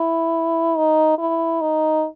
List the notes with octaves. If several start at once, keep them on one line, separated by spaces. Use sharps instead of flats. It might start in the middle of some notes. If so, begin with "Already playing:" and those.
Already playing: E4
D#4
E4
D#4